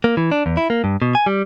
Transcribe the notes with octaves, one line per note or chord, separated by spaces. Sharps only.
A#3
E3
D4
E2
E4
A#3
G2
B2
G#5
G3